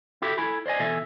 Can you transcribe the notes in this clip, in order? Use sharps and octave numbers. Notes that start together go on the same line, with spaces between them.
E4 F#4 G4 A4
E4 A4 G#5 B5
C5 D5 D#5 G#5
B2 E3 A4 E5 G#5